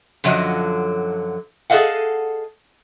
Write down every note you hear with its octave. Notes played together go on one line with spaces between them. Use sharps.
F#2 D3 F3 F#3 D#5
G#4 A4 C5 D#5 F5 F#5